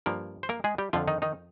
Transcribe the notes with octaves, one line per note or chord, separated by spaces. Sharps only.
G2 F3 A#3 A#4
C5
A#3 A#4
G#3 G#4
G3 G4
F2 D3 F3 F4
D#3 D#4
D#3 D#4